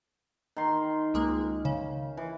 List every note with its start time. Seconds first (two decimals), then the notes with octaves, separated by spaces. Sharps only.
0.57 D#3 C6
1.14 C#2 G#3 A#3
1.65 C#3
2.17 E3